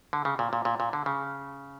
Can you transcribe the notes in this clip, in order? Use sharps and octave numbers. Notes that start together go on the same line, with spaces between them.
D3
C#3
A#2
A#2
A#2
A#2
D3
C#3